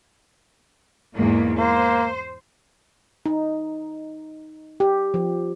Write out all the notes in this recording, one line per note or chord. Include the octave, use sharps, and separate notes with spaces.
E2 G#2 A#3
A#3 C5
D#4
G4
F3